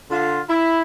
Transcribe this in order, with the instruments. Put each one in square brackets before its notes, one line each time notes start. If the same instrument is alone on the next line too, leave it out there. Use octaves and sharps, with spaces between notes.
[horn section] D3 F4
E4